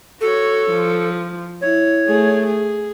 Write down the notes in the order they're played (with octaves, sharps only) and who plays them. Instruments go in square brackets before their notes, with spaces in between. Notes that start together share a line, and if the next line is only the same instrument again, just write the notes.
[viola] F#4 C#5 [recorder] A4
[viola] F3
[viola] E4 [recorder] C#5
[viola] A3 G#4
G#4